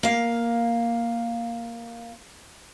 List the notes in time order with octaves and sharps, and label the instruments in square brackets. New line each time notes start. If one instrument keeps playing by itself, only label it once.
[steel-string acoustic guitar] A#3 F5